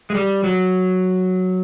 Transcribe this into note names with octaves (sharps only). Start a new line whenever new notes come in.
G#3
G3
F#3